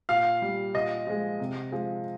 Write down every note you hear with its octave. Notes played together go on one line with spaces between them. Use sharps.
A#2 F5
G3
A#2 D#5
F3 G#3
C3
F3 G#3